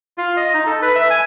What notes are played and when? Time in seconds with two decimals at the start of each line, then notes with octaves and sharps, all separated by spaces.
0.18 F4
0.37 D#5
0.54 D#4
0.66 A4
0.82 B4
0.95 E5
1.10 G#5